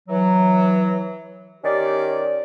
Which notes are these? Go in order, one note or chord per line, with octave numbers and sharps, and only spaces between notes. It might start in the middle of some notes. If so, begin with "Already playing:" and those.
E3 F#3
D#3 C#4 G4 D5